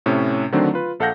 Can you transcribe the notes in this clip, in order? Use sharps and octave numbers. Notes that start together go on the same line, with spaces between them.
A2 C3 C#4
D3 D#3 F#3 A3 C4 D4
F4 B4
A#1 A4 F5 F#5 G6 A#6